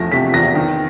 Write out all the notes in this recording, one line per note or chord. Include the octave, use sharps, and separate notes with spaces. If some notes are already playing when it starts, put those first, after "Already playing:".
Already playing: E2 F3 A3 A#6
C3 B6
E2 A#6
D#3